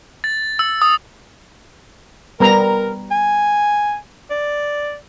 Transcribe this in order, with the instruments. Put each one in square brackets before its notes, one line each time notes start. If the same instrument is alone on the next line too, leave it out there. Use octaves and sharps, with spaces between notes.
[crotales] A6
E6
D#6
[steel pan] G3 B3 A#5 [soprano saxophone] A#4
[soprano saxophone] G#5
D5